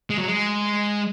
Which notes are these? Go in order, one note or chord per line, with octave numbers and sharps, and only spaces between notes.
G#3
F#3
G#3